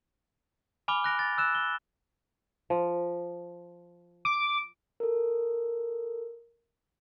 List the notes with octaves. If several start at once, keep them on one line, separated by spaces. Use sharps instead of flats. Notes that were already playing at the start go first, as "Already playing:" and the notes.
G#5 B5 D6 F6 F7 G7
F#6 A#6 D7
A6
E6 F#6 E7
G7
F3
D6
A4 A#4